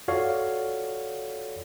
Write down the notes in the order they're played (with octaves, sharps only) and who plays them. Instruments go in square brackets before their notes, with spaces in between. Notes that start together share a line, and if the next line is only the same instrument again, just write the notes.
[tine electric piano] F4 F#4 A4 C#5 D5 F5